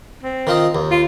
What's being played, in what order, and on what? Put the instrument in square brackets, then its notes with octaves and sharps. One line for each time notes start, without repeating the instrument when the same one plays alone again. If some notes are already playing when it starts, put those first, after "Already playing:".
[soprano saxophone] C4
[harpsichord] D#3 F4 D#5
D#2
[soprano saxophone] F4